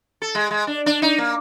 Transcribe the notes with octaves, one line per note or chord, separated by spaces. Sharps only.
A4
G#3
G#3
D4
D4
D#4
A#3